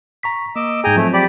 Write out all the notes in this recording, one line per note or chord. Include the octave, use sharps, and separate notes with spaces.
A#5 C#6 B6
A#3 D#5 D6 E6
G#2 G#4 G5 G#5 A#5
F3 F#3 A3 C4
G4 D5 B5